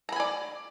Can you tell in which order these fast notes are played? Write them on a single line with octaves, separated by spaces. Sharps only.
A#5 B5 G#5 D5